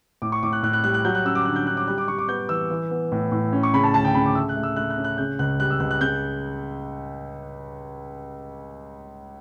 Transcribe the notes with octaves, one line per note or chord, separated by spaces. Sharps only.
A2 D6
C#6
A2 D6
F#6
A2 F#6
F#6
G3 F#6
F#6
F#3 G6
F#6
C#4 E6
D6
D3 F#6
G6
D3 F#6
D6
G3 F#6
D6
G3 C#6
D6
B3 G6
E3 E6
E3
B3
A2
A2
C#4
C#6
C#3 B5
A5
D2 A5
G5
C#3 B5
D6
A3 E6
F#6
A3
E6
A3 F#6
F#6
C#4
F#6
C#3 G6
C#2 F#6
G3 F#6
E6
C#2 F#6
F#6
C#3 G6